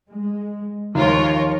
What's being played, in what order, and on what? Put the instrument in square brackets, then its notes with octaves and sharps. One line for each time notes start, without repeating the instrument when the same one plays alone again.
[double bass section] G#3
[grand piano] D#2 [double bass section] F3 [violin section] F4 A#4 C#5